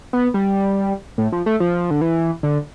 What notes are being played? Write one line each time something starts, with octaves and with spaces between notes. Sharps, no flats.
B3
G3
A2
F3
A3
F3
D3
E3
D3